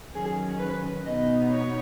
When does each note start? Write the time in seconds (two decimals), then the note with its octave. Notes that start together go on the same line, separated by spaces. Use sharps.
0.14 D#3 F#3 C#4 G#4
0.59 B4
1.05 B2 B3 D#4 D#5
1.50 C#5